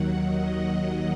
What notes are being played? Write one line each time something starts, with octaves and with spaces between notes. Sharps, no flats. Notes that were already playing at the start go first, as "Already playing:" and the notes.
Already playing: D#2 D#3 F#3 F#5
D#5